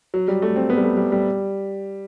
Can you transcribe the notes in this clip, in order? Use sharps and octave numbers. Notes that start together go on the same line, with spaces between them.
F#3
G3
A3
C4
B3
G3
A3
G3
G3